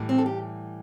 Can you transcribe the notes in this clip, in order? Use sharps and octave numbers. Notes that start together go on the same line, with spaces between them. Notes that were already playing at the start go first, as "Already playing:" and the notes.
Already playing: A2 E3 G3
C4
A4
G4